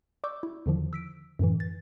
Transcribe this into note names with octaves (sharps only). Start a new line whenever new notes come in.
D5 C#6 D6 E6 G6
E4
E2 D3 D#3 F3
E6 B6 D7
F#2 A2 D3 E3
A6